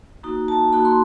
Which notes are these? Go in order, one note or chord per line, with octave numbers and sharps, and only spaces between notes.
A#3 D#4 F#4
A5
A#3 D#4 F#4 B5
C6